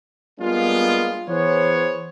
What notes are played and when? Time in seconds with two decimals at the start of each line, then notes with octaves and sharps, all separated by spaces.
0.40 G3 G#3 A#3 B3 D4 F4
1.28 E3 B3 G#4 C5 C#5